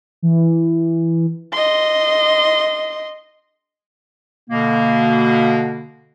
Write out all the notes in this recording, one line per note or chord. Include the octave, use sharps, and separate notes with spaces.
E3
D#5 C6
B2 D3 A#3